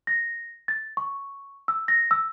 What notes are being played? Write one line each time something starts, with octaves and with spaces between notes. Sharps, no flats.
A#6
A6
C#6
E6
A#6
E6